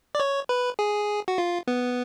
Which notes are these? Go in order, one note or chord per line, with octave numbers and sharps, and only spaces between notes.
D5
C#5
B4
G#4
F#4
F4
B3